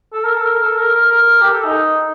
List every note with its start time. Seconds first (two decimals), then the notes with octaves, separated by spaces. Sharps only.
0.13 A4
0.24 A#4
0.34 A4
0.45 A#4
0.62 A4
0.78 A#4
0.94 A#4
1.11 A#4
1.42 G4
1.52 A4
1.64 D#4